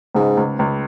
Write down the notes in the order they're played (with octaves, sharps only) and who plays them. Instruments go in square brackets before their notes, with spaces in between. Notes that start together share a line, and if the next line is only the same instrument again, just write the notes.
[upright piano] C#2 [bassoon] G#2
[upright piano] C#2
C#2